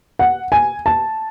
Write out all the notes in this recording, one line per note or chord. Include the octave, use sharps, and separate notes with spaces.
F#5
G#5
A5